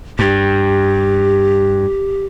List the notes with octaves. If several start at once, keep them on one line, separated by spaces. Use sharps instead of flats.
G2 G4